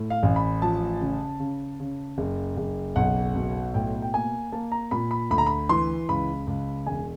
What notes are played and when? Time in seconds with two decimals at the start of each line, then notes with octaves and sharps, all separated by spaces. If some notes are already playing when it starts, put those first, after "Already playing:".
Already playing: A2
0.10 F5
0.23 A1
0.36 B5
0.62 F3 A5
1.01 C#3
1.40 C#3
1.80 C#3
2.18 F#1
2.57 F#1
2.96 B1 F#5
3.35 B2
3.74 A2 G5
4.02 G5
4.14 A#3 G#5
4.52 A#3 A5
4.72 A#5
4.91 A#2 B5
5.11 B5
5.31 D2 B5
5.38 A#5
5.46 B5
5.69 E3 C6
6.09 C#2 B5
6.47 C#2
6.86 E1 G#5